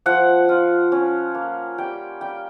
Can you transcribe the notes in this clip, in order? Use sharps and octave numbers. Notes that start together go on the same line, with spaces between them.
F3 F#5
F4
C#4
A#3
G3 G5
G3 G5